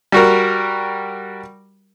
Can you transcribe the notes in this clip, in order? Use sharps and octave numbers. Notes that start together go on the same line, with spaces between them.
G3 F#4 A#4